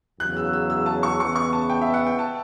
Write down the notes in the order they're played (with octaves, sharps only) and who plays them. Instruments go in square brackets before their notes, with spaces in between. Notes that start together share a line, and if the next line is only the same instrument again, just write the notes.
[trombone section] E2 C#3 F#3 [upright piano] F#6
[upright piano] E6
E6
E6
A5
C#6
[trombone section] E2 C#3 E3 B3 [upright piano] C#6
[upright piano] C#6
A5
G5
E5
F#5
G5
A5